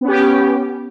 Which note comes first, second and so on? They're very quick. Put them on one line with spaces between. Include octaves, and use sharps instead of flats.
B3 C#4 G4